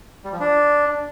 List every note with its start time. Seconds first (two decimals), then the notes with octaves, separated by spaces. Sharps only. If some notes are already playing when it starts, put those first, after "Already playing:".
0.24 G3
0.32 F3
0.40 D4